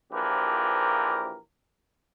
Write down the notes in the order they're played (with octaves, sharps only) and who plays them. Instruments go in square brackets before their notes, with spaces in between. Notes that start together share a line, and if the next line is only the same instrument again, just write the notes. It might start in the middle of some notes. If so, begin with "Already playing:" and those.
[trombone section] A#1 E3 F3 G4 A#4